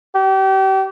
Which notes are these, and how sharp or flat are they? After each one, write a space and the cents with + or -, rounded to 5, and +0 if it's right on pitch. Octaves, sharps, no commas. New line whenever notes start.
G4 -35